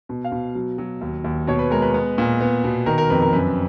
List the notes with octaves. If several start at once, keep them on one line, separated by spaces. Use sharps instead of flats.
B2
F5
B2
F#3
F#3
D#2
D#2
B2 C#5
B4
G#3 A#4
B4
B3
A#2
B3
B2
D#3 A#4
A#4
F2 B4
A#4
F#2 B4